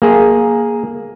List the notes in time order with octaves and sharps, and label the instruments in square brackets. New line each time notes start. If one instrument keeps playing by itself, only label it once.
[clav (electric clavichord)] A#3 G#4